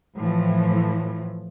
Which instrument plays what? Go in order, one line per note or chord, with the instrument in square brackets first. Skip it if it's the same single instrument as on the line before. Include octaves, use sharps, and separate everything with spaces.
[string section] A2 E3 F3